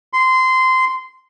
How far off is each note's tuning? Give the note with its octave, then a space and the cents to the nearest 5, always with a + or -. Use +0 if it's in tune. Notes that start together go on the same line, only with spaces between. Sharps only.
C6 -15